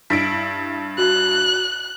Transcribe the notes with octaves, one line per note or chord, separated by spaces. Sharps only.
G2 E4 B6 D7
F#4 F#6